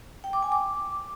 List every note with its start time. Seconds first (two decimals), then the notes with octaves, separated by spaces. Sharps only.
0.24 G5
0.33 D6
0.43 G#5
0.52 D6